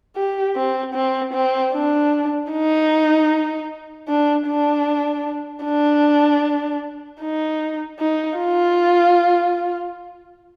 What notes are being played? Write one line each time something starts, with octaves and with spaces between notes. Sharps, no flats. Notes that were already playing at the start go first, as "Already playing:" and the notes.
G4
C4
C4
C4
D4
D#4
D4
D4
D4
D#4
D#4
F4